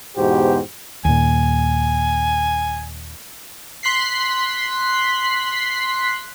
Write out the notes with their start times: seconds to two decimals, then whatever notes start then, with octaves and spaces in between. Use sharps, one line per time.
0.17 E2 G#2 B2 F#4 G4 C5
1.05 D#2 A#2 G#5
3.83 C6 F#6 B6 C7